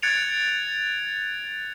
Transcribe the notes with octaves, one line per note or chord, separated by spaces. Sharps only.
F#6 G#6 A6 C#7 D7 F7